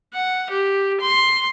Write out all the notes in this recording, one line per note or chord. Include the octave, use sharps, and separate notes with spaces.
F#5
G4
C6